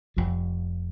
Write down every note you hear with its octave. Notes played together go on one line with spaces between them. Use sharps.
F1 F2 C3 F3